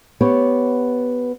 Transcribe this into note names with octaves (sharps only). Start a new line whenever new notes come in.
B3 G4 C#5